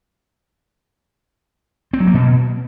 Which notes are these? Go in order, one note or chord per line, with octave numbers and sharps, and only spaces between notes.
C4
F#3
A#3
B2